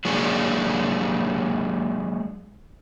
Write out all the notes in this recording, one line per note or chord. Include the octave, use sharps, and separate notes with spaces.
F#3 G#3 A#3 D4 F#4 G#4